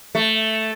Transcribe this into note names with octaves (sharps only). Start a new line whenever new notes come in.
A3